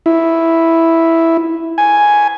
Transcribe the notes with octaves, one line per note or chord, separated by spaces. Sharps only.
E4
G#5